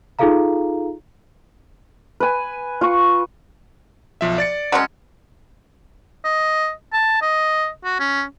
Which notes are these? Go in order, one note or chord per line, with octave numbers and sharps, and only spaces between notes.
D#4 F4 G#4 A4 F5 A#5
B4 G#5
F4 C#6
B1 F3 E5
D5 A6 C#7
F#3 G#3 C#4
D#5
A5
D#5
F#4
C#4